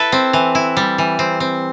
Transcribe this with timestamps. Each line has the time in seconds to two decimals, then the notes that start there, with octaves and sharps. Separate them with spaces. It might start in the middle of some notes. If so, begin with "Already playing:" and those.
Already playing: E4 A4 B4
0.12 C4
0.33 E3
0.55 E4
0.77 G3
0.98 E3
1.19 C4
1.40 C4